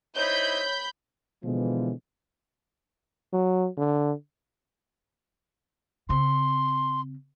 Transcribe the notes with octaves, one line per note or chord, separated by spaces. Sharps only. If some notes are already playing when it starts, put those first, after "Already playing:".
D#4 E4 C5 C#5 B5 G6
B2 D3 E3 F3 G#3
F#3
D3
C#3 C4 C6